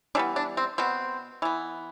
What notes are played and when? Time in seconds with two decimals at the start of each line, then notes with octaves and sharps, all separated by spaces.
0.15 E3 G3 B3 D4
0.36 D4
0.57 C4
0.78 B2 B3 C4
1.42 E3 B3